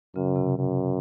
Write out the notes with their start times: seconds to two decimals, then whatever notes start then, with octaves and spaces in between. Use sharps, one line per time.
0.16 F#2 C#3
0.36 C3
0.58 F#2